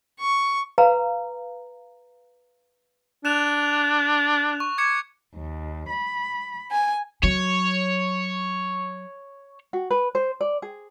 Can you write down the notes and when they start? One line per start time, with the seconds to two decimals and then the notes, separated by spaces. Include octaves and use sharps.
0.20 C#6
0.78 B4 F5 A#5
3.25 D4 F#6 E7 F7
4.60 C#6
4.78 D6 G#6 C#7
5.34 D#2
5.90 B5
6.71 G#5
7.23 F#3 C#5
9.73 F#4
9.91 B4
10.15 C5
10.41 D5
10.62 G#4